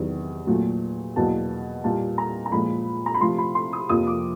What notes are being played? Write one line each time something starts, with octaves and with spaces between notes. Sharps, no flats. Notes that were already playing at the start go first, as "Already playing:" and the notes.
Already playing: E2 C3 D#3 F#3
A#2 F#3 A3
E2 B2 F#3 A#3 A5
A#2 G3 A#3 A5
A#5
A#5
A#2 F3 G#3 B5
A#5
B5
C3 F3 A3 C6
B5
C6
D#6
F2 C3 F3 A#3 D#6
D6